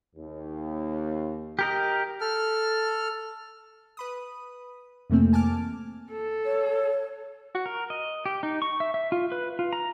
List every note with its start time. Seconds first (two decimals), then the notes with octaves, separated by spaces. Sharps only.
0.16 D#2
1.59 G4 A#4 D#5
2.21 A4 F6
3.97 B4 B5 D#6
5.10 F2 C3 E3 A3 A#3 C4
5.33 G#5 A5 D6 F6
6.11 A4
6.45 C#5
7.55 F#4
7.66 A#4
7.90 D#5
8.26 G4
8.43 D#4
8.62 C#6
8.80 E5
8.94 E5
9.12 F4
9.32 B4
9.59 F4
9.73 A#5